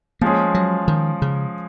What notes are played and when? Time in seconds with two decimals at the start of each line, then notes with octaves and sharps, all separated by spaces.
0.21 F3 G#3 A#3 C#4 G#4
0.55 F#3
0.88 D#3
1.22 C#3